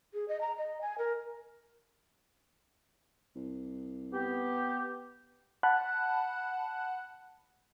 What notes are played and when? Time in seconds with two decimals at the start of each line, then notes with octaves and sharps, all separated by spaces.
0.14 G#4
0.28 D#5
0.41 A#5
0.57 D#5
0.81 G#5
0.98 A#4
3.36 C2
4.13 B3 G4
5.63 F#5 A5 B5 F#6